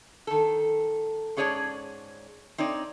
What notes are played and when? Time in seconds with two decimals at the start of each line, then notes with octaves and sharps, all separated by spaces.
0.27 D#3 A4
1.37 G#2 C#4 G#4 C#5 D5 A5
2.58 C4 D#4 C#5 D5